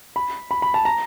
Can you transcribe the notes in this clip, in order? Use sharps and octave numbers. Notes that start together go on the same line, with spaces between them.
B5
B5
B5
A5
A#5